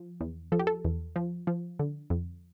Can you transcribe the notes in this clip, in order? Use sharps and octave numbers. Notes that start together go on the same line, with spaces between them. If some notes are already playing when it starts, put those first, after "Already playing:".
Already playing: F3
E2
F3 A4
G4
A4
E2
F3
F3
D3
F2